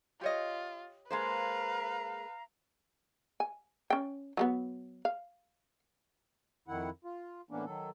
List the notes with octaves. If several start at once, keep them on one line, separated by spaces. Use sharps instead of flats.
F4 G4 C#5 D#5
G#3 A#3 B4 C5 F5 A#5
G#5
C#4 G5
F#3 G#3 B3
F5
F2 D#3 E4 F#5
F4
A2 E3 A#3 B3 C#4 D4
D#3 F#3 A4